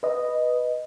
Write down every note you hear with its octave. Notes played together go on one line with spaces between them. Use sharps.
B4 D#5